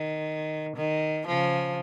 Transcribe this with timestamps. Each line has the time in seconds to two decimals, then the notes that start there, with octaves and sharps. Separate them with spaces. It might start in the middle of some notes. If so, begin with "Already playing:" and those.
Already playing: D#3
0.76 D#3
1.27 C#3 F3